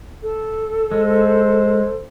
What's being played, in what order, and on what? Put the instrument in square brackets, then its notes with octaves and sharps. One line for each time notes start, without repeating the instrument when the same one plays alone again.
[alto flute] A4
[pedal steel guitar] G#3 [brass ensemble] C5